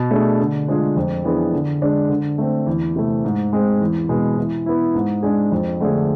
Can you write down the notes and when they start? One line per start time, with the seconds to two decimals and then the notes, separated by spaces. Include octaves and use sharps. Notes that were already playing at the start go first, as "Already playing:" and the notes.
Already playing: B2
0.11 A3 D4 G#4
0.40 D3
0.68 G#3 D4 F4 G#4
0.96 F2
1.24 E3 B3 D4 G#4
1.52 D3
1.82 G#3 D4
2.09 D3
2.38 A3 C4
2.66 E2
2.96 C3 E3 A3
3.24 G#2
3.53 G#3 C4
3.81 E2
4.09 B2 G#3 B3
4.37 E3
4.66 B3 E4
4.95 G#2
5.23 G#3 D4 G#4
5.52 F2
5.80 D3 A3 D4 G#4